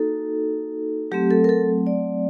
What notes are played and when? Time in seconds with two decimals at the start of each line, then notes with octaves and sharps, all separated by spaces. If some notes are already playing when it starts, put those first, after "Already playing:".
Already playing: A#3 D#4 F#4 A4
1.11 F#3 A3 C4 G4
1.31 A4
1.44 A#4
1.49 A4
1.87 D5